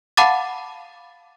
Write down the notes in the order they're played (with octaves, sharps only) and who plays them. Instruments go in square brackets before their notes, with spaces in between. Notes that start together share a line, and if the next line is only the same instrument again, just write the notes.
[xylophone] F5 F#5 A5 B5 D6 A6